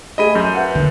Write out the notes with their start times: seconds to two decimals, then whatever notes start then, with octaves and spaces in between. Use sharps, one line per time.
0.18 A3 G4 G#4 D#5 B5 D#7
0.35 F#2 G6
0.54 B4 E5 F#5
0.75 D3